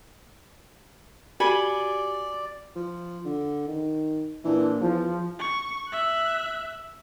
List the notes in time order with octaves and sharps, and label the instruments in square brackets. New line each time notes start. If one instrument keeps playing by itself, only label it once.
[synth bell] F#4 G4 [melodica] D5 [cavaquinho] G#5 B5
[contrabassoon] F3
D3
D#3
[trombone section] A#2 D4 [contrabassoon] E3
[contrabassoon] E2 [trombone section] F3
[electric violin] C#6
E5 F#6